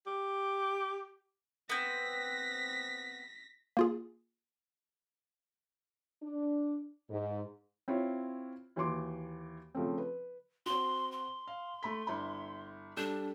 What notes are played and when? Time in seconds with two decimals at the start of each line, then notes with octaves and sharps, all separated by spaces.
0.07 G4
1.69 B3 C4 A#6 B6
3.77 A#3 F4 G#4
6.23 D4
7.10 G#2
7.88 C4 E4 F4 C#5
8.76 D#2 E3 F#4 C6 D6
9.75 C#3 F3 A3 C4
9.98 B4
10.66 C4 F#4 C6
11.12 C6
11.47 F5
11.83 A3 B5 B6
12.07 G1 E4 B5
12.97 G3 D4 A4 G6